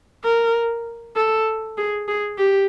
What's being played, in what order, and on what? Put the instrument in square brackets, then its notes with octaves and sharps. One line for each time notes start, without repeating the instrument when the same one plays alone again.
[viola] A#4
A4
G#4
G#4
G4